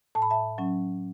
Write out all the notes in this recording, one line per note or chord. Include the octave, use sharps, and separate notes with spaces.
A2 A5
B5
E5 A5
F#3 C#4